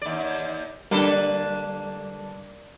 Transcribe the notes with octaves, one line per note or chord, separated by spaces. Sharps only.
D#2 D5
D3 G3 A#3 D4 A4 B4